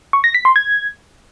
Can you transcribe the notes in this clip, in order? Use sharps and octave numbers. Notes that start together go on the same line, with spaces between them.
C#6
A#6
B6
C6
G#6